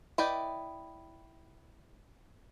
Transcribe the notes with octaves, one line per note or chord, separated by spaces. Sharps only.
E4 B4 D5 D#5 G5